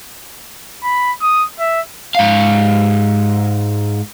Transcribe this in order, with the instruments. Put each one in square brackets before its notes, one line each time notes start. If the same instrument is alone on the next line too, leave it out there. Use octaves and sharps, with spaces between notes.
[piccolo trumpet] B5
D#6
E5
[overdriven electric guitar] G#2 F5